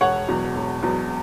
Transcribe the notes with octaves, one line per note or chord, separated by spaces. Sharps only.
E1 C#5 F#5
E2 B2 F#3
E1
E2 B2 F#3